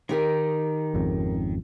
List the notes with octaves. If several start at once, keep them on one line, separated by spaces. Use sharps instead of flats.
D#3 D#4 G4 A#4
G#1 F2 C#3